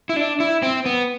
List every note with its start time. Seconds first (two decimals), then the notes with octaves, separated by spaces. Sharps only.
0.09 E4
0.16 D4
0.40 E4
0.63 C4
0.86 B3